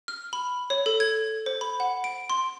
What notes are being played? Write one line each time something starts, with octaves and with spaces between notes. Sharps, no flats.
F6
B5
C#5
A4
G#6
C5
B5
F#5
D7
C6